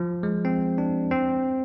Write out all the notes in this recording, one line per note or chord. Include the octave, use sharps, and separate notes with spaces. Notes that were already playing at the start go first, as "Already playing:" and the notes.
Already playing: F3
G#3
C4
D4
C4